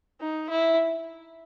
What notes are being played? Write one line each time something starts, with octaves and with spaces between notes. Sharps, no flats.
D#4
E4